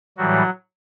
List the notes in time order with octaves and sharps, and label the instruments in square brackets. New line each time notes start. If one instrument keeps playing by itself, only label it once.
[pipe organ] A2 E3 F#3 G3 F#4